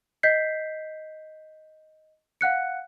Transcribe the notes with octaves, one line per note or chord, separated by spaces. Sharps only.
D#5 G6 B6 C7
F5 F#5 F#6 C#7